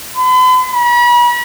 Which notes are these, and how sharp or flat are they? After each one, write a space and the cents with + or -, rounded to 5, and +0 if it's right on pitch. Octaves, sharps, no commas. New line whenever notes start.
B5 +45
B5 -40